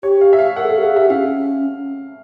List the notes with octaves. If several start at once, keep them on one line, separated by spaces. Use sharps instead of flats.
G4 C#5
F5
E5
F5
A#4 F#5
G#4
A4 F5
G4
G#4 F5
G4 E5
C#4 F5